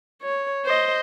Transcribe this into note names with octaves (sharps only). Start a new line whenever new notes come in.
C#5
C5 D#5